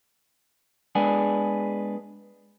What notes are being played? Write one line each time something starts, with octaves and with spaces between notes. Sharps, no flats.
G#3 B3 D4 G#4